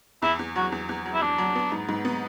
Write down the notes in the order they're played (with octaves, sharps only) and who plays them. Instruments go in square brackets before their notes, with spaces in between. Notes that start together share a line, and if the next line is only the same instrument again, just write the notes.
[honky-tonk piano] E2 [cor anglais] E4
[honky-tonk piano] E2
[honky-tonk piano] F#3 [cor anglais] F#4
[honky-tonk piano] E2
E2
F#3
[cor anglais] E4
[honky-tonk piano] E2 [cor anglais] D4
[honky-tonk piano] F#3
B3
G#2
G#2
B3